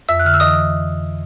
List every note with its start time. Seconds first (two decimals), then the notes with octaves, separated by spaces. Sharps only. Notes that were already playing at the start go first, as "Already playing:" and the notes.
0.09 F2 E5 E6
0.20 F#6
0.25 D3 F6
0.34 E6
0.40 E3 D#5 D#6